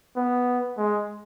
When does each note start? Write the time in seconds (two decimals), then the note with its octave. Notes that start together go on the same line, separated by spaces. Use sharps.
0.16 B3
0.77 G#3